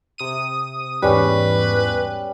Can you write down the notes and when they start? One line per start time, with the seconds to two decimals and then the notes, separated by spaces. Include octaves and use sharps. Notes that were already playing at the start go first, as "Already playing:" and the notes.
0.18 C3 D#6 D#7
1.02 E2 G#2 G3 C#4 B4